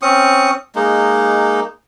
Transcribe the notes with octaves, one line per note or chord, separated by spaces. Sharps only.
C4 C#4 C#6 D#6
G#3 A#3 D#4